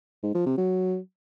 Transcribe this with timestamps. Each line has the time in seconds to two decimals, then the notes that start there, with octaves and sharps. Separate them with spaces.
0.23 G#2
0.35 F3
0.46 C3
0.58 F#3